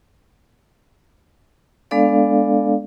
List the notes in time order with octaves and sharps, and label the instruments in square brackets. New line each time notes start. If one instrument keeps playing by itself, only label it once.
[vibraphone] G#3 B3 D4 A4 D5 F5